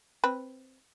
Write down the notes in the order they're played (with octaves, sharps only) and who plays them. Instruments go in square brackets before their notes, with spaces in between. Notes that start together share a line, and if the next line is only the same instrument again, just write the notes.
[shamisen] C4 B4